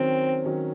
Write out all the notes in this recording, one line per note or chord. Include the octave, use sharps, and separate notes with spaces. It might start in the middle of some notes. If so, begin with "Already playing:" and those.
Already playing: D#3 F#3 C4 C#4
D#3 F#3 C#4